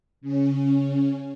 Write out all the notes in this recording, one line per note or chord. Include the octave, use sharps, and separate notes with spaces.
C#3 C#4